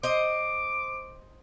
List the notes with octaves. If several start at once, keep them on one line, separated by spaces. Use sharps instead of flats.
C5 D#5 D6